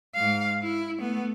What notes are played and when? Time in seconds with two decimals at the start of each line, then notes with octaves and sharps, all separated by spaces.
0.15 G#2 F5
0.63 E4
0.99 A3 B3